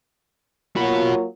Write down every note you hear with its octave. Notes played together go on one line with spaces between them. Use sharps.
F#3 A#3 F4 F#4 B5